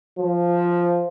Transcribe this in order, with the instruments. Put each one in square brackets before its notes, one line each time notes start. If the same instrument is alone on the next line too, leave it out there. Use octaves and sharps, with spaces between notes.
[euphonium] F3